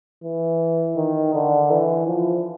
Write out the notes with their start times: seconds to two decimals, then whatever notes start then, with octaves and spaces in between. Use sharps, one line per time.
0.24 E3
0.97 D#3
1.34 D3
1.70 E3
2.07 F3